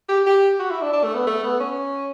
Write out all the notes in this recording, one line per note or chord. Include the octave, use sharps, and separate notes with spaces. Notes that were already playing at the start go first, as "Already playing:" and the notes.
G4
G4
F#4
E4
D4
D4
A3
B3
A3
B3
C#4